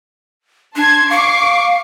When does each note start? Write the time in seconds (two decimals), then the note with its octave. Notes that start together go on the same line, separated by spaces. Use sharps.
0.76 D4 A5 C6 G#6
1.10 F5 C#6 D6 C7